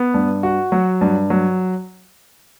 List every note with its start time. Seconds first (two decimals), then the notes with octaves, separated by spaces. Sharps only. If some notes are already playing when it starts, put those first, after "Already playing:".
Already playing: B3
0.14 G2
0.43 F#4
0.72 F#3
1.01 G2
1.30 F#3